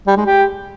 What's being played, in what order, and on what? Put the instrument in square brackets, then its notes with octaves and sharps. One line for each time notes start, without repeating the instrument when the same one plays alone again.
[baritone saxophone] G3
G#3
G4